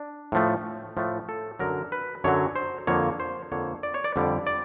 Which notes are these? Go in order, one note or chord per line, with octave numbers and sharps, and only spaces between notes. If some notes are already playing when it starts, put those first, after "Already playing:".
Already playing: D4
A2 F3 A3
A2 F3 A3
A4
F#2 D3 F#3 A#4
B4
F#2 D3 F#3 C#5
C5
F2 D3 F3 A#3 C#5
C5
F2 D3 F3 A#3 C#5
D5
C#5
D5
F2 D3 G3
D5